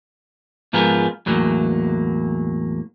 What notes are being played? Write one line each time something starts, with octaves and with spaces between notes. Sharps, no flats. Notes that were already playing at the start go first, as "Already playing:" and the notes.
G#2 F3 B3 F4 G#4 A#4
E2 A2 F#3 A#3